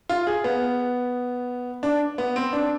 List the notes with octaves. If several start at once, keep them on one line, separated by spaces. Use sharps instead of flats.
F4
G#4
B3
D4
B3
C4
D4